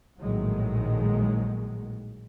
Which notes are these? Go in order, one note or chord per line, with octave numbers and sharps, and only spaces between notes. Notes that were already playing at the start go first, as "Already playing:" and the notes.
A#1 A2 D#3 F#3 G#3